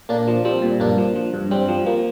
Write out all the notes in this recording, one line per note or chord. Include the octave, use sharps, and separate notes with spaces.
A#2 A#3 D4
F3
F3 G3 C4
A#2
G2 A#3 D4
F3
F3
G2
G2 G3 C4
F3
F3 A#3